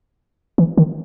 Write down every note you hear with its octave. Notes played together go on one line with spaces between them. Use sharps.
E3
D#3